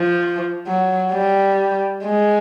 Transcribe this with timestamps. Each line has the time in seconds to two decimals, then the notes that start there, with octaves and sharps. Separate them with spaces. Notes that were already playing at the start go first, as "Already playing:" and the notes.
Already playing: F3
0.67 F#3
1.12 G3
2.04 G#3